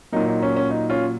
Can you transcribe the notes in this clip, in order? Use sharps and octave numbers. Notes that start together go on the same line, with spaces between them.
A#2 F#3 A#3 D#4
D#4
C#4
C#4
D#4
C#4 F4